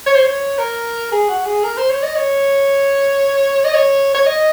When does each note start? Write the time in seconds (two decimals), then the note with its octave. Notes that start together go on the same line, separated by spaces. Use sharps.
0.06 C#5
0.15 C5
0.25 C#5
0.58 A#4
1.11 G#4
1.28 F#4
1.45 G#4
1.63 A#4
1.77 C5
1.90 C#5
2.03 D#5
2.15 C#5
3.64 D#5
3.74 C#5
4.15 C#5
4.26 D#5